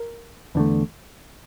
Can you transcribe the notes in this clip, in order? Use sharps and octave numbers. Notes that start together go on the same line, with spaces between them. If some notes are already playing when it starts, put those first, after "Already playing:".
Already playing: A#4
E2 D3 A3